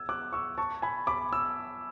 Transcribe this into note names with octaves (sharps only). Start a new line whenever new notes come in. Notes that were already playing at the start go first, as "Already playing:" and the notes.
Already playing: E6 G#6
D6 F#6
C#6 E6
A5 C#6
G#5 B5
B5 D6
E6